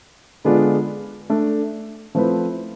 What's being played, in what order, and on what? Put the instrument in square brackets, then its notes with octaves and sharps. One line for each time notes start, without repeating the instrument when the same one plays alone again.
[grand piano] D3 G#3 B3 D4 F4
A3 D4 A4 D5
F3 A3 C4 E4 B4